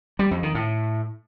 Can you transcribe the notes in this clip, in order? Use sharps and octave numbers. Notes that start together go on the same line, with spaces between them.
G3
F2
D#3
A2